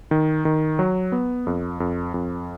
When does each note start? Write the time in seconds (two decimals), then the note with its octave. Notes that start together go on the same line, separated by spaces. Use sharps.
0.11 D#3
0.45 D#3
0.79 F#3
1.12 B3
1.47 F2
1.80 F2
2.14 F2